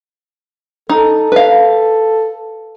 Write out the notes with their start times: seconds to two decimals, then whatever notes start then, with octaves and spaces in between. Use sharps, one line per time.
0.89 D#4 A4
1.32 B4 F5